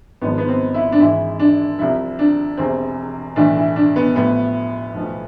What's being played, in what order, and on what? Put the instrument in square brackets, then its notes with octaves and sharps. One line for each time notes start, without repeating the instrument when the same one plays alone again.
[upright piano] G#1 G#2 F3 B3
B3
C4
E4
D4
G#1 G#2 E3 E4
D4
C2 C3 F3 E4
D4
E1 E2 C3 C4
B1 A2 E3 D4
E4
D4
B3
A1 A2 F3 B3
B1 A2 F3